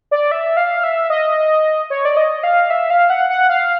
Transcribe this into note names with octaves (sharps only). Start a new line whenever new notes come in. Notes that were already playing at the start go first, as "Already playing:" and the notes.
D5
E5
F5
E5
D#5
C#5
D5
D#5
F5
E5
F5
F#5
F#5
F5